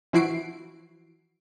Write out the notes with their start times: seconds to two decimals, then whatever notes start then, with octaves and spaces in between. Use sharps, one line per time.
0.13 E3 F3 E4 F#4 C7 D7